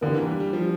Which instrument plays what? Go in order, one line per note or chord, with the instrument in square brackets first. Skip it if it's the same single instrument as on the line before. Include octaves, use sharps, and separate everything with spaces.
[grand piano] D3 [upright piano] A#3 D4 G4
[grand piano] E3
G3
G3
F3